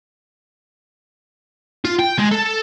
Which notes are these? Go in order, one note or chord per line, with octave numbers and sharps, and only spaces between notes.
F4
G5
G#3
A4